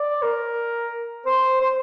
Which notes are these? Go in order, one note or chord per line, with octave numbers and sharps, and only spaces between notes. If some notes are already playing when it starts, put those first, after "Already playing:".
Already playing: D5
A#4
C5
C5